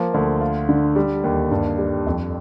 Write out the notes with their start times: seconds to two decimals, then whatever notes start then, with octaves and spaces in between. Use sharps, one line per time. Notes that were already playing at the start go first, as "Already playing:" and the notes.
Already playing: F3 A#3
0.14 D2
0.41 F4
0.69 D3
0.96 G3
1.24 D#2
1.51 G2
1.78 G3
2.06 F2